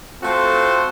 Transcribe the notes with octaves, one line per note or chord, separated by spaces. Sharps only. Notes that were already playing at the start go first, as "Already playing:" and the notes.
A3 C4 F4 F#4 A4 C5